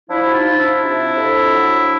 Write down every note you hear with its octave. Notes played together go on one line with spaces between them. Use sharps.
F3 D4 E4
F#4
D#4 F4
F3
D4 E4
C3
F2
F#3